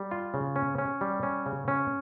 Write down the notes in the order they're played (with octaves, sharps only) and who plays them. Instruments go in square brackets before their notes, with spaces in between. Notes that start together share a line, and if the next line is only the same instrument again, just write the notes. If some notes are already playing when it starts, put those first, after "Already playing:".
Already playing: [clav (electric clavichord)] G3
F4
C#3
C#4
C#4
G3
C#4
C#3
C#4